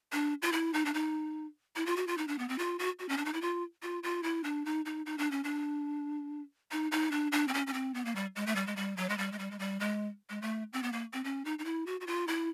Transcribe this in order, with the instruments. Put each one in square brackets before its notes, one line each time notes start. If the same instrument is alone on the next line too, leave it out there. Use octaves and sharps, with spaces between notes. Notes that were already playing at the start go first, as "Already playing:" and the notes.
[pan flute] D4
F4
E4
D#4
D4
D#4
E4
F4
F#4
F4
D#4
D4
B3
C4
F4
F#4
F#4
C#4
D4
D#4
E4
F4
F4
F4
E4
D4
D#4
D#4
D#4
D4
C#4
D4
D#4
D#4
D4
D4
C4
C#4
C#4
C4
B3
A#3
G3
G#3
A3
G3
G#3
G3
F#3
G#3
G3
G#3
G3
G#3
G3
G#3
G#3
A3
C4
B3
A#3
C4
C#4
D#4
D#4
E4
F#4
F#4
F4
E4